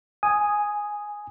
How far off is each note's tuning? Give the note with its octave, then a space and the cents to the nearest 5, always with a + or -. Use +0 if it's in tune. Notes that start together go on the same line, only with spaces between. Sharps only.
G#5 +0 D#6 +0